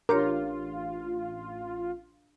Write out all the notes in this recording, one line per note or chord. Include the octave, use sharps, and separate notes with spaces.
A1 D4 F4 G4 A#4 C#5